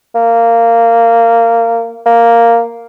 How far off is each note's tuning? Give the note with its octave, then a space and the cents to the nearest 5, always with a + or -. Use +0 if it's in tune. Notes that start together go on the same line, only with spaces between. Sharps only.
A#3 -15
A#3 -5